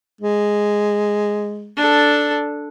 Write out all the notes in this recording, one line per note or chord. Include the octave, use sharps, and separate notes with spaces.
G#3
D4 A4